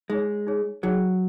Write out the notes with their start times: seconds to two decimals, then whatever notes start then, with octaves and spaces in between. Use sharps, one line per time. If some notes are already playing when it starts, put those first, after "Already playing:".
0.10 G#3 D#4 G#4 C#5
0.47 D#4 G#4 C#5
0.83 F#3 D#4 G#4 C#5